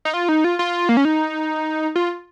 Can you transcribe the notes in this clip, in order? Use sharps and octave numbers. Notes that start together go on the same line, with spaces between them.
D#4
F4
D#4
F4
F4
A#3
C#4
D#4
F4